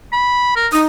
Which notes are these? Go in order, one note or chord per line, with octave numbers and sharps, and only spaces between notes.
B5
A#4
D#4 D#6